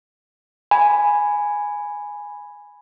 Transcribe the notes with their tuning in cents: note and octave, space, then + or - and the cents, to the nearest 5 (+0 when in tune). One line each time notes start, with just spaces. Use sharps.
G#5 +0 B5 +0